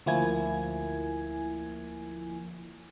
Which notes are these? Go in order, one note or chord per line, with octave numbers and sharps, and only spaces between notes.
D2 F3 A#3 E4 G#5 G#6